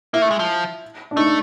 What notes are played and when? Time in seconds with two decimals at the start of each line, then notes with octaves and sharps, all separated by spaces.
0.14 A#3 E4
0.22 A3
0.31 G#3
0.39 F3
1.11 D4
1.17 A3 D#4